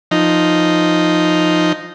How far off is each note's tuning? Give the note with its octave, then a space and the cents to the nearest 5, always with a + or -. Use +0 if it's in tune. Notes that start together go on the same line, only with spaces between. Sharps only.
F3 +0 D#4 +0